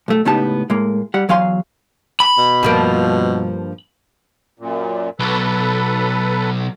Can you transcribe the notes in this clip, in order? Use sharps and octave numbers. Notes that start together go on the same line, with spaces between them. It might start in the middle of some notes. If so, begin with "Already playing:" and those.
B1 A3
C#2 A2 B3 D#4 G4 A5
A2 G#3 A#3
G3 F#5
E2 F#3 F5 G#5 C6
B5
B2
G2 F3 A#3
F#2 A#2
B1 A4 B4